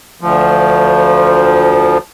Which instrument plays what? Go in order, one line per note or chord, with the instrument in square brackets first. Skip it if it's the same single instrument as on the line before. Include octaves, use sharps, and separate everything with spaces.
[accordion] D2 F3